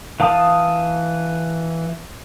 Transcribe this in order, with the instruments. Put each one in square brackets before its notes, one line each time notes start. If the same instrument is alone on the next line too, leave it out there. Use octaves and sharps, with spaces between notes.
[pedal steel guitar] E3 F5 A5 D#6